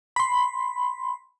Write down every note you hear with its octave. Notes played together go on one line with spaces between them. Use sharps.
B5 C6